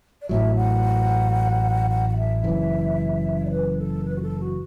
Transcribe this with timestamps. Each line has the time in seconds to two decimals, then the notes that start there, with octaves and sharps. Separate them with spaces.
0.22 D5
0.29 A1 A2 F#3 E5
0.56 F#5
1.90 F#5
2.09 F#5
2.17 E5
2.44 F#1 F#2 E3
3.45 D5
3.51 B4
3.78 A4
4.05 B4
4.16 F#4
4.22 A4
4.40 F#4